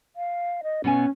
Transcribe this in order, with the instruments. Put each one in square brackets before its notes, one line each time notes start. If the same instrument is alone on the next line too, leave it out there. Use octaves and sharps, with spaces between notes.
[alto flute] F5
D#5
[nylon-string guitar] B2 B3 G#5 [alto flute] C#4